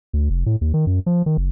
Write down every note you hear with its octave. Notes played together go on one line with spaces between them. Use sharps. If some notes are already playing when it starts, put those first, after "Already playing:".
D2
F1
A2
D#2
D#3
F#2
F3
D#3
F#1